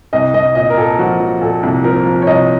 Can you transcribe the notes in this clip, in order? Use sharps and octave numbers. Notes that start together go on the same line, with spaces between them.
C2 D#5
C2 D#5
A#2 D#5
A#4
A#2 A4
F3 F#4
F3
A#2 A4
C2
F3 A#4
F3
C#5
C2 D#5